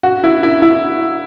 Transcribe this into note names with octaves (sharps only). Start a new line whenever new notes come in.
F#4
E4
E4
E4